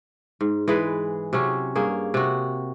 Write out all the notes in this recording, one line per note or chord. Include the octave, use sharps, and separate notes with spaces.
G#2
E3 G#3 G#4 B4
C3 F#3 C#4
G2 A#3 G#4
C3 F#4